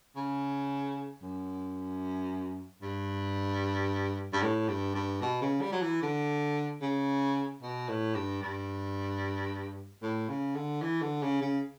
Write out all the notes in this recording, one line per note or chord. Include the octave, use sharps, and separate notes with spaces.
C#3
F#2
G2
G2
A2
G2
G2
B2
C#3
G3
F#3
E3
D3
C#3
B2
A2
G2
G2
A2
C#3
D3
E3
D3
C#3
C#3